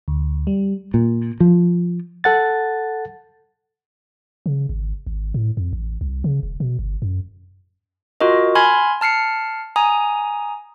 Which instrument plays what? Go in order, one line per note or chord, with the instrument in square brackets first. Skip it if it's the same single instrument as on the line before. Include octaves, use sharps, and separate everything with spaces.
[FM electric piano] D2
G3
[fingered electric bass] A#2
F3
[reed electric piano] A4 F#5 A6
[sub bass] C#3
G#1
G#1
A2
F2
A1
C2
C#3
E1
B2
G1
F#2
[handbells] F4 F#4 A#4 D#5
G#5 B5 C6 F6 G#6
A5 F6 C7 C#7
G#5 A#5 D#6